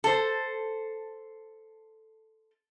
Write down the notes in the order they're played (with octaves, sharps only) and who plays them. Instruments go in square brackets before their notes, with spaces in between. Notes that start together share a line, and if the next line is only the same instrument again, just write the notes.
[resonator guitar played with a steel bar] A4 C5